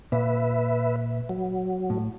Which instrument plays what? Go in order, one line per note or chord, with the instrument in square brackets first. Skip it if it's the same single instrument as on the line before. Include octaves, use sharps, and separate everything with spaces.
[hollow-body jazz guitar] A#2 [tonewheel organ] B4 E5
[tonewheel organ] F#3
[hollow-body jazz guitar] A2